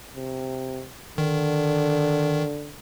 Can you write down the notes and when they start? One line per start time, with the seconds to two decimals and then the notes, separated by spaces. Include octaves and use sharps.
0.16 C3
1.18 D3 D#3